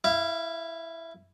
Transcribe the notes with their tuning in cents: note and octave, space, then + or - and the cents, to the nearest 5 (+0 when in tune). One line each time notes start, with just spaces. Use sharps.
E4 +0 F5 -30